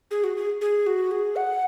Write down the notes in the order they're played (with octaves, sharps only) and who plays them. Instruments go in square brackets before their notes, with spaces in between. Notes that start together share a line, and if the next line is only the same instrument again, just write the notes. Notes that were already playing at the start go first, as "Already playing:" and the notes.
[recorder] G#4
F#4
G#4
G#4
F#4
G#4
F#5